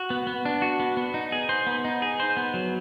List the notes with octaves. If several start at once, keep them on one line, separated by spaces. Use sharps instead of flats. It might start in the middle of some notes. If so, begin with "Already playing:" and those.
Already playing: F#4
B3
B3
D4
F#4
B3
B3
D#4
G#4
C5
B3
D#4
G#4
C5
B3
F#3